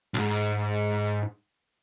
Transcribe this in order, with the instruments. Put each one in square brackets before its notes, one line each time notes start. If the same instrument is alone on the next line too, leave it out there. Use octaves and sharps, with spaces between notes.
[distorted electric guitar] B1 G#2